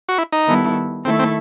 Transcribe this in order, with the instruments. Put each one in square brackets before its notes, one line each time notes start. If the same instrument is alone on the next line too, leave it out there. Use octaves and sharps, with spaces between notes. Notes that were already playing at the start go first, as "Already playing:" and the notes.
[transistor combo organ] F#4
E4
D#4
[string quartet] D#3 G3 B3 E4 A4
[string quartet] D#3 A3 E4 A4 E5 [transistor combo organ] C4
[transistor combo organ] C4